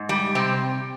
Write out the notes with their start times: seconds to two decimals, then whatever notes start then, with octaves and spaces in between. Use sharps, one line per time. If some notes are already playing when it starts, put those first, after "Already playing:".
Already playing: G#2
0.09 G3
0.35 C3 C4